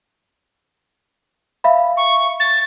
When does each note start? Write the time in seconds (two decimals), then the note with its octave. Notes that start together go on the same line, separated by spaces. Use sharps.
1.64 E5 F5 B5
1.97 C#6
2.40 A6